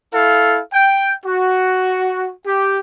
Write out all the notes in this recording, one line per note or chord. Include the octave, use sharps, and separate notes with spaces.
E4 A4 F5
G5
F#4
G4